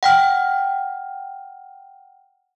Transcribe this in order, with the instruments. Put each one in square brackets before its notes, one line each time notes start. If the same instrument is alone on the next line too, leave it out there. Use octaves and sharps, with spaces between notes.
[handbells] F#5 G5 F6